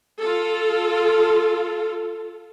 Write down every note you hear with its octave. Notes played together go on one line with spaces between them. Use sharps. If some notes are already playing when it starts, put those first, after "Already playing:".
F4 A4